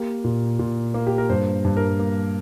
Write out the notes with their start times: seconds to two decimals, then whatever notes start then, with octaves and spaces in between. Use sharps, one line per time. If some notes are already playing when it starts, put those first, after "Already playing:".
Already playing: A#3 G4
0.24 A#2
0.59 A#2
0.94 A#3
1.07 G4
1.18 A#4
1.30 G2 C5
1.65 G2
1.77 A#4
1.99 A#3